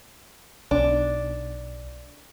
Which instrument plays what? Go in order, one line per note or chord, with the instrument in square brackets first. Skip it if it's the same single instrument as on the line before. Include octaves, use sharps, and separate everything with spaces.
[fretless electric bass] B1 [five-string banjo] D4